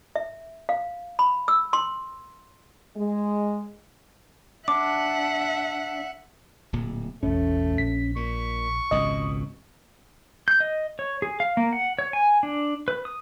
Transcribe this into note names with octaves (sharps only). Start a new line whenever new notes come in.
E5
F5
B5
E6
C6
G#3
D4 E5 F#5 D6
D1 A#2
E1 A1 A2 A3 C#4
A#1 B6
A#2 C#6
G#1 C#2 B2 D#5
G6
D#5
C#5
G#4
F5
A#3
F#5
C#5
G#5
D4
B4
D#6